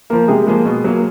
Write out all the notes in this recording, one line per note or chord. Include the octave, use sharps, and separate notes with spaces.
F3 A#3 A#4
C3 G#3 G#4
F3 G#3 A#3 G#4
B2
F#3 A#3